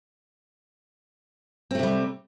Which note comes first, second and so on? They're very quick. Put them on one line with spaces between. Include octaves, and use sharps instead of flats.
C4 A3 C3 G3